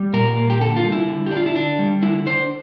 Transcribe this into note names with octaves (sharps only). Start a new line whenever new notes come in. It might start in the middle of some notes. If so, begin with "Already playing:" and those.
Already playing: G3
A#2 A#4
A#3
G4
D3 A4
F4
G3
E4
D3
G4
D4
F4
E4
D3 D4
G3
D3 E4
D4 C5